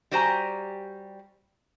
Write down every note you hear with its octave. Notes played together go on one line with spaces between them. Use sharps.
G3 F#4 G4 C5 G#5 A#5